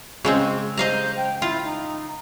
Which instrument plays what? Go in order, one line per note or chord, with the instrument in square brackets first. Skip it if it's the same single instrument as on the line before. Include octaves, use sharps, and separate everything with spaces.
[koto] C#3 G#3 C4
[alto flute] C5 [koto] D#5 F5 A#5
[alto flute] G5
[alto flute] E4 [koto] F4
[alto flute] D#4